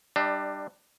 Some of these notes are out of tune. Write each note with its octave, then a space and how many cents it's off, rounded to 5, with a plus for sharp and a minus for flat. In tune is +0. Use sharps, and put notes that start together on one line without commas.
G3 +0 D4 +20 E5 -40